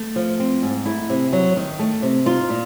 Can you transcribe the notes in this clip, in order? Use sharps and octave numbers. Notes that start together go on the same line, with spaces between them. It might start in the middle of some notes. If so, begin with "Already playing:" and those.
Already playing: A3
F3
C4
G#2
A3 E4
C3
F#3
D#3
A3
C3
D#4 F4
A#2